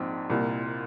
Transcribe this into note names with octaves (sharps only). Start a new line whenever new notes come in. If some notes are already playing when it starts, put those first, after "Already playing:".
Already playing: A#1 G#2 C4
C2 A#2